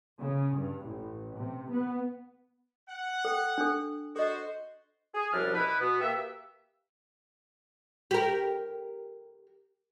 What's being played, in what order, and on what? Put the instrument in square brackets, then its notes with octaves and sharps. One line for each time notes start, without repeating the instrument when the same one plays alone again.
[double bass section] C#3
G2
A1
C3
B3
[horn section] F#5
[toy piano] A4 G5
D4 A4
[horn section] F#4 C5 [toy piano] A4 D#5
[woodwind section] G#4
C2 F#2 F3 G3 D4 F6
B2 E4 B4
B2 B3
A#3 G4 B4 E5
[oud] G4 A#4